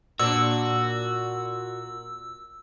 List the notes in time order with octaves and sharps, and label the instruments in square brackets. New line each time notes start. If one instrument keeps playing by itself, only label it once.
[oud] A#2 D4 [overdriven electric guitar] F#4 [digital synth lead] E6